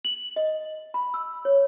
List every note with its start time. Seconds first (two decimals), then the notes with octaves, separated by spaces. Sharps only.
0.05 F#7
0.36 D#5
0.94 B5
1.14 E6
1.45 C#5